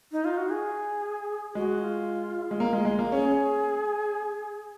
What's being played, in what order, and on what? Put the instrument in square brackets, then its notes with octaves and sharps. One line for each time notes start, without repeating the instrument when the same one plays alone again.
[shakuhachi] D#4
F4
F#4
G#4
[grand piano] G#3 [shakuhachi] F#4
[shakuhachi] F4
[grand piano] G#3
A#3
G#3
G#3
A#3
[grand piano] C#4 [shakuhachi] G#4